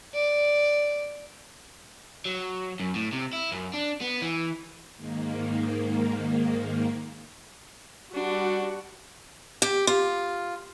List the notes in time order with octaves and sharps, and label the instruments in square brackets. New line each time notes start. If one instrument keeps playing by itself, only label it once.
[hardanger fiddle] D5
[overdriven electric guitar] F#3
F#2
A2
C3
E4
F#2
D4
B3
E3
[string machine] G#2 D#3 A#3
[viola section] G3 F#4 [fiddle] D4
[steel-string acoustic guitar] G4
F4